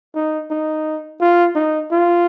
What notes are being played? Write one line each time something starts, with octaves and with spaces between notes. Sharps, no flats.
D#4
D#4
F4
D#4
F4